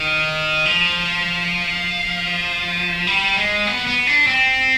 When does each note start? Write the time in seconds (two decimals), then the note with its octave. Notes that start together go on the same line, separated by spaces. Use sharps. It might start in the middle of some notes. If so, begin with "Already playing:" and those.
Already playing: D#3
0.66 F3
3.07 G3
3.37 G#3
3.67 B3
3.87 B3
4.07 D4
4.27 C4